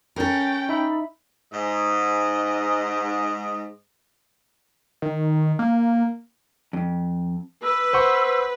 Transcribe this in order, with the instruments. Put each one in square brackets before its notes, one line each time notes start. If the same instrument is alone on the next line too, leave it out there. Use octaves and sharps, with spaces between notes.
[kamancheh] C#4 G5 [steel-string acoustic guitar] A4 A#4
[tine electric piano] D#4 E5 B5
[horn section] G#2 D#5
[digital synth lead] D#3
A#3
[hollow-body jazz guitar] F2
[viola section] B4 [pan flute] E6
[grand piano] C5 F#5 C#6